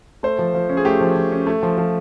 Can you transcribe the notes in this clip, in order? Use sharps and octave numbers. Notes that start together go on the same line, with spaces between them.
A3 C5
F3
F3
C#4
G#4
A3 G4
F3
F3
C#4
A3
F3
F3